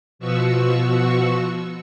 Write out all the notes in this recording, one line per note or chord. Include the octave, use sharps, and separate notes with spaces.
B2 F3 B3 F#4 C#6 E6